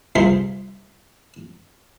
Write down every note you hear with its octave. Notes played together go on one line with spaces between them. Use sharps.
C2 C3 F4 G#4 C5 B5